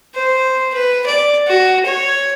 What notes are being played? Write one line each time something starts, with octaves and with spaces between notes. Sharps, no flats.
C5
B4
D5
F#4
C#5